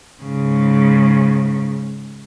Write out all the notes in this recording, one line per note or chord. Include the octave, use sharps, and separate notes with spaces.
G#2 C#3